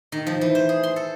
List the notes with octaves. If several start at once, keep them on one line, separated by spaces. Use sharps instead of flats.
D#3
F3
E3
C5
G#4
C6
A4